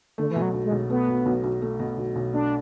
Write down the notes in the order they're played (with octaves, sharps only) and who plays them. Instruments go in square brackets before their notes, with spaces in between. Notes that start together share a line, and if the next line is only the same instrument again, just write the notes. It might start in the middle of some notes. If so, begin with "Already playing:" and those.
[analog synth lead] D3 [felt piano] A3
[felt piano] B2 [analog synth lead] E3
[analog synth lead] F#3
[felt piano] B1
[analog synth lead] G#3
[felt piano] B1
[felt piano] A3 [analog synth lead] B3
[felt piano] B2
B1
B1
A3
B2
B1
B1
[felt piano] A3 [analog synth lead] D4